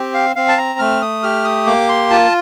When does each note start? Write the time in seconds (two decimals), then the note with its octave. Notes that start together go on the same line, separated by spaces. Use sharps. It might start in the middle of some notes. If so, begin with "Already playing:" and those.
Already playing: C4 G4
0.14 F5
0.36 C4 F5
0.48 A5
0.57 A#5
0.79 A3 F6
1.02 D#6
1.23 G4 F6
1.44 D#6
1.66 A#3 D6
1.89 C6
2.10 F4 A5